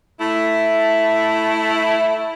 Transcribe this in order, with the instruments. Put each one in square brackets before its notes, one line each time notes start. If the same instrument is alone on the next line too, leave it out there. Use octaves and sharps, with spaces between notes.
[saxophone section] A3 E4